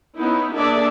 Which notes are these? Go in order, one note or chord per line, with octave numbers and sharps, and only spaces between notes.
B3 C#4 D#4 E4
A#3 D4 G#4 A4 D5 E5